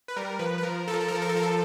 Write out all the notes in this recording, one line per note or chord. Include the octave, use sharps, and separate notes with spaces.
B4
G3 A#4
F3 B4
B4
F3 A#4
F3 A4
A#4
A4
A#4
F3 A4
A#4
A4
F3 A#4
A4